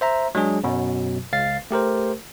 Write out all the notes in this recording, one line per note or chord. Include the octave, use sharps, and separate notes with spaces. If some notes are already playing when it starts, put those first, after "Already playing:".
C5 E5 A#5
F#3 G#3 D4 G#4
F#2 B2 F#3
C#2 F5 A6 C7
A3 G4 A#4 C5